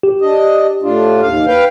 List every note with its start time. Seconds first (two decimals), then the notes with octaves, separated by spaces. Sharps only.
0.03 G4
0.21 D4 D#5
0.82 A2 D4 F4
1.21 D#2 F5
1.47 B4 F5 G5